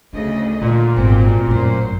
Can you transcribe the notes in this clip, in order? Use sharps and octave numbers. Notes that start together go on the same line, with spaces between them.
D2 C#3 D4 D#5
A#2 D3 D#3
G#1 B2 G#3 C4
A1 F#2 F#3 C5